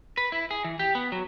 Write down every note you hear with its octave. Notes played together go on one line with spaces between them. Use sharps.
B4
E4
G#4
E3
G4
B3
F#3